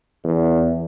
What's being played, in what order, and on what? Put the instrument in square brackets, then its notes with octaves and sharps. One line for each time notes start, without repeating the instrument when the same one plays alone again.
[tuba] E2